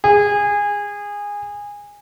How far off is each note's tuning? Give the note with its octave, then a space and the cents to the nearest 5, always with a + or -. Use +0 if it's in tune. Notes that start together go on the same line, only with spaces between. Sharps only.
G#4 -20